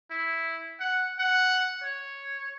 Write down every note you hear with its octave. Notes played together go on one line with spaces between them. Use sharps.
E4
F#5
F#5
C#5